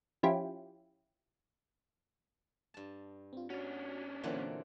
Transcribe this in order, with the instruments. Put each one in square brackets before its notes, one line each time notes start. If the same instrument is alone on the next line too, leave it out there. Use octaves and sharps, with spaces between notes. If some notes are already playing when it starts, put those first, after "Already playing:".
[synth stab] F3 C#4 E4 F4 G4
[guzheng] G2 A5
[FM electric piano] C4 F4
[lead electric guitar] C#4 D4 [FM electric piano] F#4
[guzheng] A#2 E3 F#3 [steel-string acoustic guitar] D3 C4 [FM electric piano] A#3 E4 A#4